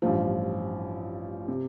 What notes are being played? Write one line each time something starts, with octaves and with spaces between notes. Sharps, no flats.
A1 G2 F3
C3